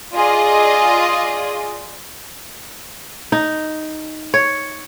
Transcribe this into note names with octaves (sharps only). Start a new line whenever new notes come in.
F4 G#4 D5 D#5
D#4
C#5